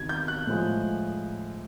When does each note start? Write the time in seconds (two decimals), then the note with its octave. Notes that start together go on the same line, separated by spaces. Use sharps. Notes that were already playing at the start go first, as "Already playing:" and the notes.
Already playing: E2 C3 D#3 F#3 G#6
0.09 G6
0.28 F#6
0.47 A2 F3 G#3